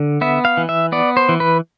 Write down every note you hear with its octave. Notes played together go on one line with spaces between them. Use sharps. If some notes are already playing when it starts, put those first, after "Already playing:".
Already playing: D3
B3 E5
F5
E3
E5
B3 D5
C5
E3
B4